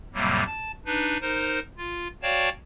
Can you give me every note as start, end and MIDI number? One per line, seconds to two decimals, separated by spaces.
0.14 0.43 41
0.14 0.43 45
0.14 0.43 48
0.14 0.43 54
0.14 0.43 55
0.14 0.43 58
0.47 0.72 81
0.86 1.17 62
0.86 1.17 63
0.86 1.17 71
1.21 1.60 63
1.21 1.60 70
1.21 1.60 72
1.78 2.08 65
2.23 2.49 66
2.23 2.49 73
2.23 2.49 74
2.23 2.49 77
2.23 2.49 79
2.23 2.49 81